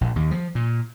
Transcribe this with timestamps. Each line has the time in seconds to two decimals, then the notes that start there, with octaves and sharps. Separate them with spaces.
0.01 A#1
0.16 D#2
0.31 F3
0.55 A#2